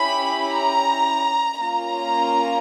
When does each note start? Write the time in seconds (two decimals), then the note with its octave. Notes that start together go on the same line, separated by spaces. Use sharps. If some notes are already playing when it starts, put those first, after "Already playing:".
Already playing: C#4 E4 G4 B5
0.50 A#5
1.60 A#3 C#4 F4 A#5